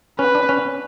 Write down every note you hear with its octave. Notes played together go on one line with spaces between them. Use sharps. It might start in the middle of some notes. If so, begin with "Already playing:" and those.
C#4 B4
D4
C#4